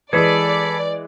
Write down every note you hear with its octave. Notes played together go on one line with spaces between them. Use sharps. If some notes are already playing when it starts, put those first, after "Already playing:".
E3 G#3 G#4 A4 B4 D5